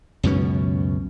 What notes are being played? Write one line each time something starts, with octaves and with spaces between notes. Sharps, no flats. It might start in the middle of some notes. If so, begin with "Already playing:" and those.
C#2 F#2 B2 C#4